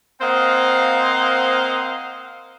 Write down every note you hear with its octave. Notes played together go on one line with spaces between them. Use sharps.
A#3 C4 C5 D#5 F5 F#5